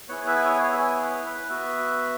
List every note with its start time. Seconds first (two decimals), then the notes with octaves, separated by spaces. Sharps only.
0.08 B3 E4 G#4 C#5 F#5
0.27 B4 E5
0.44 G#4 C#5
0.62 G#4 C#5
0.71 E5
0.79 G#4 C#5
1.03 B4
1.26 B4
1.49 B3 F#4 B4 E5